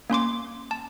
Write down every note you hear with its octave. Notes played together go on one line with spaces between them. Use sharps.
A#3 C#4 C6 D6
A5